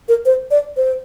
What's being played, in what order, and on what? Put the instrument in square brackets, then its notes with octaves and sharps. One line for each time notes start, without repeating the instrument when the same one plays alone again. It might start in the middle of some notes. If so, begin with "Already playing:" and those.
[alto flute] A#4
C5
D5
C5